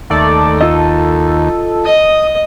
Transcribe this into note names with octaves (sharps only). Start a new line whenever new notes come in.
D#2 A3 A4 D5
F4 A4 D#5
D#5 D#6